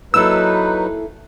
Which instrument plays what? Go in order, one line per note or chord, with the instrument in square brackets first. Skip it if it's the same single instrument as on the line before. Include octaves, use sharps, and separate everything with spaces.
[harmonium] F#3 D#4 B4 [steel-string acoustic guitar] A#3 E4 A4 [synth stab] E6